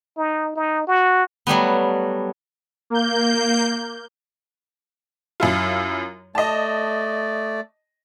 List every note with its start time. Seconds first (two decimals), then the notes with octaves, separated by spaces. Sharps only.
0.17 D#4
0.56 D#4
0.87 F#4
1.47 F#3 G3 A3 B3
2.90 A#3 G6
5.40 F#2 E4 F4
6.35 A3 D5 D#5 A5